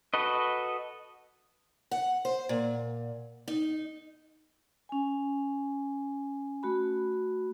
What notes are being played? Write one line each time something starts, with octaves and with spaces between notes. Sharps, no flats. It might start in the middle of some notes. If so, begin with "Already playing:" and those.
F#4 A4 B4 D#5
F#5
C5
A#2
D#4
C#4 G#5
A3 F#4 B5